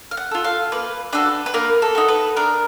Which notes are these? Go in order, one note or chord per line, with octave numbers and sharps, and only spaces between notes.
F5
F#5
F4 A4
F5
A#3 B4
D4 F#4 A4 B4
B4
A#3 A#4
A4
D#4 F#4
B4
D4 A#4